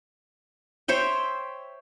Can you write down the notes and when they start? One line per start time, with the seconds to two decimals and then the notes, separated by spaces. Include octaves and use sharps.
0.88 C5 C#5 E5 G5